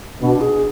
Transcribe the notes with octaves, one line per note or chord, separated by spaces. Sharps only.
B2 D4
G#4